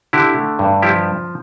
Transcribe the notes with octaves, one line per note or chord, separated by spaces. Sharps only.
D3 E4 G4
A3
G2
F3 E4 G4